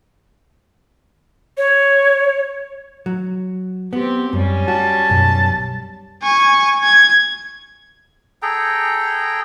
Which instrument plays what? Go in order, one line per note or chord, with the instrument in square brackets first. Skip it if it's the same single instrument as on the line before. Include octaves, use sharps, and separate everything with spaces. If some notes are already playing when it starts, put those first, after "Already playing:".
[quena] C#5
[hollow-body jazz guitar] F#3
[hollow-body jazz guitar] B3 [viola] C4 G4
[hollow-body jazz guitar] F#2 [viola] G3 C#4
[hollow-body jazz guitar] F#4 [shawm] A5
[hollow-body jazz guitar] B1 F#2
[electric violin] G#5 C#6
G#6
[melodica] G#4 A4 G5 A#5